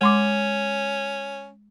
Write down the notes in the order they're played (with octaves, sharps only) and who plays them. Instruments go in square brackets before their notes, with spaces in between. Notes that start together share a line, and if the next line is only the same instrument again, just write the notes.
[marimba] G#3 C6 D6 [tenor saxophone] C#4